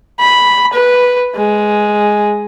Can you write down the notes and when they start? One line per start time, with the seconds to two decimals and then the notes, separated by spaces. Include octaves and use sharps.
0.19 B5
0.73 B4
1.36 G#3